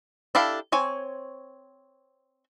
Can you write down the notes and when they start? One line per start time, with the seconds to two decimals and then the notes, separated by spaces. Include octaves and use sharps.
0.35 D4 E4 G4 A4 F5
0.72 C4 C#5 G#5